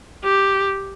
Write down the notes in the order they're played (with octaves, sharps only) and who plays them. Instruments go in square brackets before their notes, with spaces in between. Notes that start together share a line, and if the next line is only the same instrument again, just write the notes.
[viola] G4